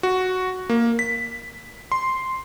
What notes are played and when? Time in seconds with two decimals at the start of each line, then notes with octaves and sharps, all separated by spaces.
0.03 F#4
0.69 A#3
0.99 B6
1.92 C6